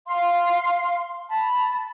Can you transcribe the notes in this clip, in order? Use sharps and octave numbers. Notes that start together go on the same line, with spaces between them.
F5 C6
A5 B5